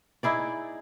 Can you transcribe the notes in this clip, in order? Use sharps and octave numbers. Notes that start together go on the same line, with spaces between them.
D#4 E4 G#4 D5